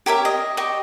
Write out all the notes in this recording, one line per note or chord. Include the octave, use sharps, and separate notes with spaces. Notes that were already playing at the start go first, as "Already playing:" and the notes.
G4 A#4 C#5 E5
D#5
G4 D#5 C#6